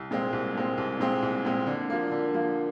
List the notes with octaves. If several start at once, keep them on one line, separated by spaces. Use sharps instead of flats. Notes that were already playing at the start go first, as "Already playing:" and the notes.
Already playing: C2
A#2 G#3 C4
C2
A#2 G#3 C4
C2
A#2 G#3 C4
C2
A#2 G#3 C4
D3
F3 A#3
D3
F3 A#3